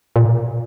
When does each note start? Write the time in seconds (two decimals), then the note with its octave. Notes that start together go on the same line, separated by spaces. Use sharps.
0.16 A#2